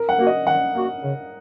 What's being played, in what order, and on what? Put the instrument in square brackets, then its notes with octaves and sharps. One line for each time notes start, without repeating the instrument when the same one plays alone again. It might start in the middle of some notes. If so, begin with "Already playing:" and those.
Already playing: [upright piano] A#4
F#5
[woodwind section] A#3 F#4
[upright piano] D#5
[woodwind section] D#3 [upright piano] F#5
[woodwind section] A#3 F#4
C#3